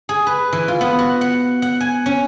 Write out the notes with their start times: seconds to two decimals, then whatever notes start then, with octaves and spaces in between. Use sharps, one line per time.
0.09 G#4
0.27 B4
0.53 E3
0.68 F4
0.81 B3
0.99 F#4
1.21 F#5
1.62 F#5
1.80 G#5
2.06 C#4